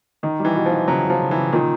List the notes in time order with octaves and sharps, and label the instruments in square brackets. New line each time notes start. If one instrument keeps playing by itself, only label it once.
[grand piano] D#3 [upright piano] D#4
[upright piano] G3
[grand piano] E3
[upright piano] B2
[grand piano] F3
[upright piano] D#4
[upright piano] C#3 [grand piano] F#3
[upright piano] C#3
[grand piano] F3
[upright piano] C#3
[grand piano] E3
[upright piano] C#3
[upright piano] A#2 [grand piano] D#3